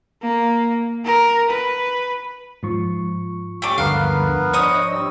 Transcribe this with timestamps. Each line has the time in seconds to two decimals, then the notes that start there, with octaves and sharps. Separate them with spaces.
0.23 A#3
1.06 A#4
1.49 B4
2.63 G#2 F3 C#6
3.62 G3 A3 C#4 G4 D6
3.78 D2 G2 D3 B3 A#4 B4 F5
4.53 D4 C5 C#5 D#5 D#6
4.91 G3 E6